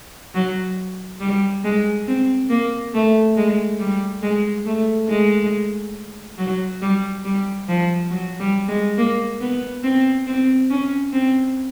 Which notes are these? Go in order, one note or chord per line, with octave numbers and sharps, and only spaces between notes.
F#3
G3
G#3
C4
A#3
A3
G#3
G3
G#3
A3
G#3
F#3
G3
G3
F3
F#3
G3
G#3
A#3
B3
C4
C4
C#4
C4